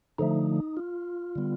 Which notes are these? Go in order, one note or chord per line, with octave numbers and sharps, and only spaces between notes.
D3 F3 A3 D#4
F4
D3 G3 B3